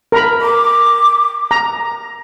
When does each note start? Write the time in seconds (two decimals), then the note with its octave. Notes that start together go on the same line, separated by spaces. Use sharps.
0.12 A#4 A#5 B5
0.41 D6
1.51 A#5